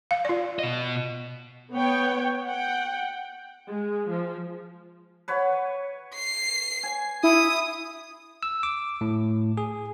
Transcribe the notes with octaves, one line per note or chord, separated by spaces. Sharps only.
F5
F4 D5
B2 D#5
B3 C#5 G5
F#5 G5
G#3
F3
B4 C#5 F#5
C7
G#5
E4 D#6
E6
D6
A2
G#4